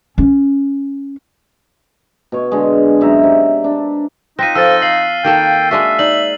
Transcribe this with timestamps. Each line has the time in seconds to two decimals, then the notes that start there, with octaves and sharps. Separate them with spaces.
0.18 C#4
2.32 B2 C#5
2.52 D3 G#3
3.01 F#2 D#4 E5 A#5
3.23 C3 D5
3.64 D4
4.39 C4 D#4 F4 F#6 A#6 B6 D#7
4.55 F3 A4 C5 F5 E6 F6 A6
4.82 F5 C7 F#7
5.25 D#3 A#3 A4 G5
5.71 G#3 D4 F#4 E5
5.99 D#4 D5 F#7